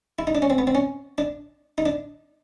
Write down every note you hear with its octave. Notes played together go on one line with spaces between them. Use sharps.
E4
D#4
D4
C#4
C4
B3
C4
C#4
D4
D#4
D4